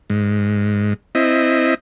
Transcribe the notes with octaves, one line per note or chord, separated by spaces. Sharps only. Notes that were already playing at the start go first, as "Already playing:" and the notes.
G#2
C4 E4 D#5